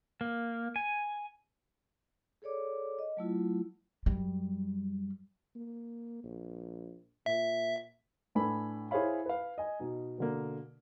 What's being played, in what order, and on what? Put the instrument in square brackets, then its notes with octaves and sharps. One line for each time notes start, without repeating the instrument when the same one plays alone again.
[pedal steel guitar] A#3
G#5
[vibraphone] G#4 A4 C#5 D5 D6
D#5
F#3 A3 E4 F4
[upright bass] F#2 G3
[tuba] A#3
A#1
[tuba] A#2 [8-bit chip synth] E5
[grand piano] A2 D4 A4 B4 G#5 B5
E4 G#4 C5 C#5 F5 B5
B4 F5
D#5 G#5
B2 D#4
B2 D3 A#3